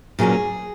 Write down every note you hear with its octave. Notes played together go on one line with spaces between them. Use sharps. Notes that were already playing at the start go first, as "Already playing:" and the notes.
A#2 F#3 C#4 G#4